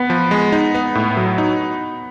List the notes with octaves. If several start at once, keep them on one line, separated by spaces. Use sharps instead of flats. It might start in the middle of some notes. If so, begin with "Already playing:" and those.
Already playing: B3
F3
G#3
D#4
B3
A2
F#3
D#4